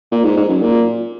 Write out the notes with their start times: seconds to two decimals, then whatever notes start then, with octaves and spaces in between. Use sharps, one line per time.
0.12 A#2
0.24 G#2
0.37 G#2
0.49 F#2
0.61 A#2